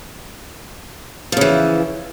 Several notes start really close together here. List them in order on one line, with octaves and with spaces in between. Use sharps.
F3 C#3 E3